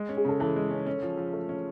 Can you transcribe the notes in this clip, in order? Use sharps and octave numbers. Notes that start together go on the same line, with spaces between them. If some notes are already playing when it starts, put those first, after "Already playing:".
Already playing: G#3
C#4
G#4
C#3 A4
E3 A4
G#3
C#4
C#4
F3
F3
A3
C#4